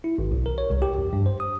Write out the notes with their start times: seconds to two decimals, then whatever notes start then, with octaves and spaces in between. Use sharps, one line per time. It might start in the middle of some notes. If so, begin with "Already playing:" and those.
0.04 E4
0.18 G#1
0.32 B1
0.46 A#4
0.58 C#5
0.70 C2
0.82 G4
0.98 F2
1.13 G2
1.26 C5
1.40 D#6